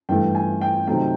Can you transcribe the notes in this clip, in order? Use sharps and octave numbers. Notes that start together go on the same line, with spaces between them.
G2 E3 A3 G5
G#5
G5
C3 D#3 F#3 A3 G5